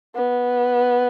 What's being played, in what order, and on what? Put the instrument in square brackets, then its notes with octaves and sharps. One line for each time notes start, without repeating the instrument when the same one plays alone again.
[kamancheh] B3